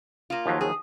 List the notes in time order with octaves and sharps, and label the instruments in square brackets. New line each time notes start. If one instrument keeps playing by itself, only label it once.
[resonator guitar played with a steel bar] A#3 F4
[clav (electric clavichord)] D#2 F3 F#3
[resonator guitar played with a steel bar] G#4